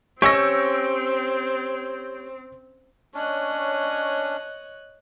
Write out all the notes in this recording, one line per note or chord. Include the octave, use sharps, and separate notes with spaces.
C4 C#4 G4 C#5 C#6 E6 A#6
C#4 D4 C#5 D#5 F#6